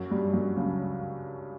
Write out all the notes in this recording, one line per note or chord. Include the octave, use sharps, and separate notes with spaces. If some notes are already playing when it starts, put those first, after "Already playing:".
Already playing: F#2 F#3
G2 G3
F#2 F#3
C#2 C#3